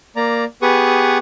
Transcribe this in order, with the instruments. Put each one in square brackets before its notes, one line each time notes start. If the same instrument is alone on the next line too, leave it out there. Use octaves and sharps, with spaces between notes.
[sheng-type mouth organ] A#3 D5 A#5
B3 G4 G#4 B4 C#6 D#6